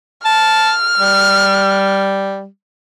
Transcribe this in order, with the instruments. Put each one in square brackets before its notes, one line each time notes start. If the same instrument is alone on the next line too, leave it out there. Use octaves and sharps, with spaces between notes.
[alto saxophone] A5 [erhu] F6
[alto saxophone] G3